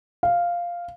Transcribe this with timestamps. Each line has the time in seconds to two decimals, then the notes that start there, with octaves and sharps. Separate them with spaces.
0.23 F5